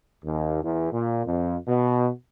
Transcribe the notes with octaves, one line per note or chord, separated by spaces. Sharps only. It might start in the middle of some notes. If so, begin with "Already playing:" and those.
D#2
E2
A#2
F2
B2